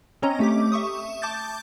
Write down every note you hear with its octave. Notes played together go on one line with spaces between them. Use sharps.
C4 C#4 C#5 D#5 A#5
A3 G4 D6
E5 C#6 D#6
A5 D6 G6 A6